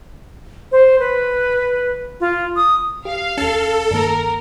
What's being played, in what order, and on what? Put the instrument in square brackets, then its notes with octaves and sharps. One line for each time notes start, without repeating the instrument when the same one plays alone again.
[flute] C5
B4
F4
D#6
[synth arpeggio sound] G4 [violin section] F5
[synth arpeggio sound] D#2 C#4 [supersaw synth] A4
[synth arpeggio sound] G2 D#3 A#3 [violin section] A#4